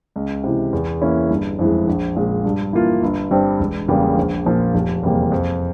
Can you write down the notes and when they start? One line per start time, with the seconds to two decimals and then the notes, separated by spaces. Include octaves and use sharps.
0.16 C#2
0.44 C3 E3
0.73 E2
1.01 E3 A#3 C#4 E4
1.30 G1
1.59 F2 E3 G#3
1.87 A#1
2.16 A#2 G#3
2.45 G2
2.73 E3 A#3 F4
3.03 G1
3.31 G2 G3 C4
3.60 E1
3.88 E2 C#3 G3 A#3
4.17 A#1
4.46 A#2 F3 A#3 F4
4.75 F1
5.03 E2 C3 G3 A#3
5.32 F2